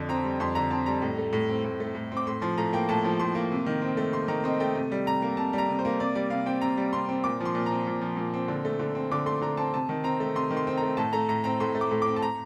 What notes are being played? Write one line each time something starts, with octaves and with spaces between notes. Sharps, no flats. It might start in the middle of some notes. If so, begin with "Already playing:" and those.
Already playing: F2 D3
C4 A#5
G3
F2 C6
D3 A#5
C4 A5
G3 A#5
A2
A3
A2
C4
A2
A3
A2
C4
D6
A2 C6
F3 C6
A2 A#5
A#3 G5
A2 A5
F3
A2 C6
A#3
C3
D#3
C4
A3
C3 C6
D#3 A#5
C4 D#5
A3 G5
C3
G3
C3 A#5
A#3
C3 A5
G3 A#5
C3
C5
A#3
C3 D5
G3 D5
C3 F5
C4 G5
C3 A#5
G3
C3 C6
C4
A#2 D6
F3 C6
A#2
A#5
C4
A#2
F3
A#2
C4
D3
A3
D3
C4
D3 D6
A3 C6
D3 A#5
C4 A5
C3 A5
D#3
C4 A#5
A3
C3 C6
D#3
C6
C4
A3 A#5
A2 A5
A3 A#5
A2 A#5
C4 A#5
A2 C6
A3
D6
A2
C4 D6
A5
A#5